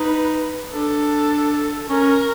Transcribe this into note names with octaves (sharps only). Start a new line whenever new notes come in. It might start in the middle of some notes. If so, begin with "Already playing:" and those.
Already playing: D#4 B4
D4 A4
C#4 A#4